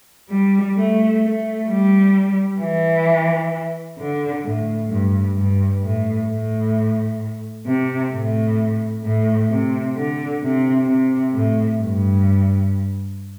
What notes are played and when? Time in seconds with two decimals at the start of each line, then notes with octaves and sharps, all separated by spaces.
0.30 G3
0.77 A3
1.22 A3
1.69 G3
2.60 E3
3.98 D3
4.45 A2
4.89 G2
5.36 G2
5.82 A2
6.27 A2
7.66 C3
8.12 A2
9.04 A2
9.49 C3
9.95 D3
10.43 C3
10.88 C3
11.34 A2
11.80 G2